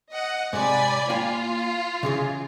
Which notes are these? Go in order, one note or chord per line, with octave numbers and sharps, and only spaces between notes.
D#5 F#5
G#2 C3 D5 G#5 B5
A#3 F4 G5 G#5
C#3 E3 G#4